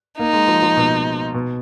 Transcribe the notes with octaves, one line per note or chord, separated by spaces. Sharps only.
A#3 D#4
G#3
F3
F3
B2
B2